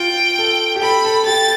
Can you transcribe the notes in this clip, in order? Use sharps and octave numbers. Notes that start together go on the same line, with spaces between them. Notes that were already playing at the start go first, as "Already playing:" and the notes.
Already playing: F4 G5
A4
G4
A4 B5
A4
G4 A6